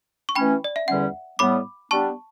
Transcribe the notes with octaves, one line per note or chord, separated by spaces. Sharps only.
C#6
E3 A3 C#4 G5 B5
D5
E5
E2 D3 G3 C#4 F#5
A2 G3 B3 B5 D6
G3 B3 D4 A5 C#6